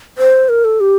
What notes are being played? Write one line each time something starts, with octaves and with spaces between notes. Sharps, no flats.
C5
A#4
A4
G4